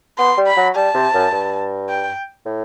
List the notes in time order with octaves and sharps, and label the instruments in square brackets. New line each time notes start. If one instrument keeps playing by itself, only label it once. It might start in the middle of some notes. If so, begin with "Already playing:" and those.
[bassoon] B3 [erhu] C6
[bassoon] G3
[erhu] B5
[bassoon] F#3
[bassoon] G3 [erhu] A5
[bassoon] C3
F#2
G2
[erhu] G5
[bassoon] A2